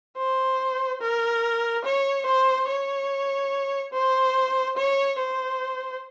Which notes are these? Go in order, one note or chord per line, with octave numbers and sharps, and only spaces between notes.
C5
A#4
C#5
C5
C#5
C5
C#5
C5